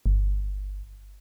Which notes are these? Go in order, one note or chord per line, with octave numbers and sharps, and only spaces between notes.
G1